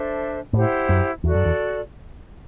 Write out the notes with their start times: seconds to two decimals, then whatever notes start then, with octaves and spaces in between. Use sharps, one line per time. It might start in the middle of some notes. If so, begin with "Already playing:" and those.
Already playing: D4 A4 C5 E5
0.53 A2 E4 G4 C5 F#5
0.89 F#2
1.24 E2 F#4 A4 D5
1.35 F#2
1.45 E2